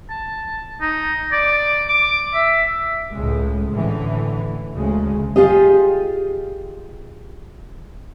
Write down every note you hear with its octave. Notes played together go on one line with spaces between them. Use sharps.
A5
D#4
D5
D6
E5
C#2 A2 G#3
A1 A2 D3 E3
D2 C#3 G#3
F4 G4 G#4 D#5